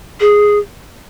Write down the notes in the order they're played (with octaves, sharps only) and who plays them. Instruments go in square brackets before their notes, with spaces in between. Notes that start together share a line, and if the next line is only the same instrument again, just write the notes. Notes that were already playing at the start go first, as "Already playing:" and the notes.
[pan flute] G#4